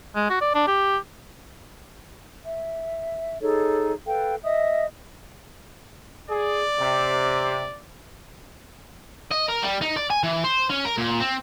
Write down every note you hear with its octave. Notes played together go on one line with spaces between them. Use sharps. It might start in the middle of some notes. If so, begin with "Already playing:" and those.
G#3
F#4
D5
D4
G4
E5
D#4 G#4 A4 C#5
A4 B4 F5 G5
D#5 E5 D#6
G#4 D5
C3
D#5
A#4
G3
D#4
D5
G#5
E3
C5
C#4
A#4
A#2
C4